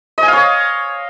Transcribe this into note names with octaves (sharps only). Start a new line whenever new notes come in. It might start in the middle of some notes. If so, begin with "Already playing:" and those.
D#5
G#5
F5
C#5